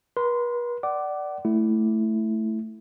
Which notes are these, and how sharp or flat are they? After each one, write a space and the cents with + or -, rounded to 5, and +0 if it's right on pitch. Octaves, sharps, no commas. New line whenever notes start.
B4 -45 C6 -15
D5 +0 F#5 +30 D6 +0
A3 +0 E4 +0